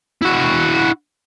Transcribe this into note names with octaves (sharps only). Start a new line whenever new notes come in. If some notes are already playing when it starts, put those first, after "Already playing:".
E4 F#4